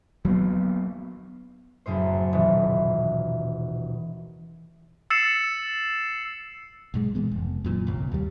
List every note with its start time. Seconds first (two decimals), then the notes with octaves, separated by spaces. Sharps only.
0.25 F#3 G3 A#3 B3
1.86 F#1 F#2 A2 C5
2.33 D#1 B2 E3
5.10 E6 A6 C7 C#7 E7
6.94 B1 G#2 G#3
7.15 A#2 E3 G#3 B3
7.31 F1
7.64 F#2 A#2 D#3 E3
7.87 G1 C2
8.11 D#2 G3